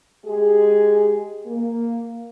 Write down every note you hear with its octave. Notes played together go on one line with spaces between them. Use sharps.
G#3 G4 G#4
A#3